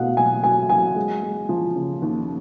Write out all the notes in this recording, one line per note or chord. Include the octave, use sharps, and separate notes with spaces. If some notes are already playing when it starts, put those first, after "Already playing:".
Already playing: B2 A3 F5 F#5
F#3 G#5
F#3 G#5
F#3 G#5
G#3
G#3
F3
C#3
D#2